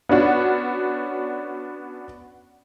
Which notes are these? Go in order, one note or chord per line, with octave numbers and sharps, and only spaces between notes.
B3 C#4 D4 F#4